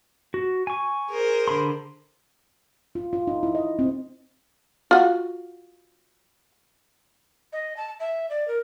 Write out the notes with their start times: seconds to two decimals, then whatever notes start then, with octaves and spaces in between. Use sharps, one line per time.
0.34 F#4
0.67 G#5 C#6
1.11 G#4 A#4 C5
1.48 D3 B5 C6
2.95 F4
3.13 F4
3.27 D#4
3.43 E4
3.55 D#5
3.79 C4
4.91 F4 F#4
7.53 D#5
7.77 A5
8.00 E5
8.30 D5
8.48 A#4